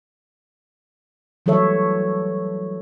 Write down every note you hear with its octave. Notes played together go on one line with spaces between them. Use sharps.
E3 F#3 G3 A4 C#5 E5